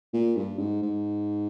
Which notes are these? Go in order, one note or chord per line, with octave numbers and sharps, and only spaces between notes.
A#2
G2
G#2
G#2